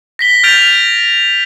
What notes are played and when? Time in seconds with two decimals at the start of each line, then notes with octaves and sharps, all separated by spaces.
0.19 A#6 B6 G7
0.43 F6 G6 A6 D7 F7